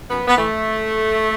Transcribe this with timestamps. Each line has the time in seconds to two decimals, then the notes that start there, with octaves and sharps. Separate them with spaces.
0.10 F#2 B3
0.28 B3
0.37 E3 A3